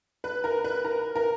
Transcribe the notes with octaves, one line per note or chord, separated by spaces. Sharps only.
B4
A#4
B4
A#4
A#4